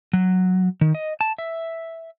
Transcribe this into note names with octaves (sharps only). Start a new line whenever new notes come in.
F#3
D#3
D#5
A5
E5